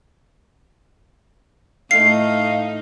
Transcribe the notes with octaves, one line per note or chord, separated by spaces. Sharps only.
A2 A3 D#4 F5 C7